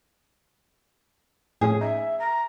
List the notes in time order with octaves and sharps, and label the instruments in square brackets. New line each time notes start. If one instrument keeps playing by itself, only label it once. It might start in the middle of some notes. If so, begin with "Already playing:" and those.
[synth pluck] A2 F3 C#4 [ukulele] G#4
[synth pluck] D#4 [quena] E5
[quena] A#5